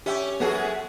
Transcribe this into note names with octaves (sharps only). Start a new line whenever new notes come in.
C#4 G4 E5 G5
F#2 B3 F#4 G#4 A4